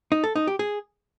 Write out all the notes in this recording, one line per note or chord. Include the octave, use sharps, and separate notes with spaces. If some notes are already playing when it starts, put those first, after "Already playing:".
D#4
A4
D#4
G4
G#4